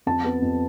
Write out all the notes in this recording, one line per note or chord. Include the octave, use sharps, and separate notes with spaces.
F2 A5
B3
F2